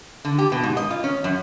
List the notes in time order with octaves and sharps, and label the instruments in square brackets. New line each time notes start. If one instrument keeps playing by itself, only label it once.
[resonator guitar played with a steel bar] D3
G4
B2
G#2
D#5
F4
C#4
F#2